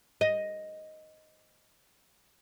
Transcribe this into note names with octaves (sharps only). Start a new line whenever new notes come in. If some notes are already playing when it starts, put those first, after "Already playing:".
D#5